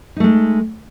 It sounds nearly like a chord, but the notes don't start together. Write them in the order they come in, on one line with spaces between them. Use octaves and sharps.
D#4 A3 G#3